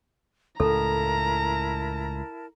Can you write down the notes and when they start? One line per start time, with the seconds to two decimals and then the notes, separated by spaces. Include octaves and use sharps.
0.60 C#2 A2 E4 A4 A#4 A5 A#5